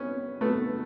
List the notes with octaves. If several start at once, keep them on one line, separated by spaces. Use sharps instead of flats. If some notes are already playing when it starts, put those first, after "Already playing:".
Already playing: B3 C#4
A3 B3